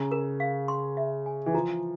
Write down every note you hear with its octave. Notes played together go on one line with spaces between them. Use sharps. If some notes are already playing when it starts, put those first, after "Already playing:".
Already playing: C#3 A#5
A#4
F5
C6
E5
G#5
E3
F3 A#5